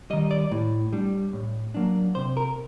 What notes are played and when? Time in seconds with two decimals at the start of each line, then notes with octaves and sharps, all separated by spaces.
0.10 D#3 G3 D#5
0.31 D5
0.51 A2
0.93 G3 D4
1.33 A2
1.74 F#3 A#3 D4
2.15 C3 C5
2.37 A#4